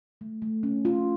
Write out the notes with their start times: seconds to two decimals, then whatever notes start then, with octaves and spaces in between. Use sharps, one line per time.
0.21 A3
0.42 A3
0.63 C#4
0.85 F4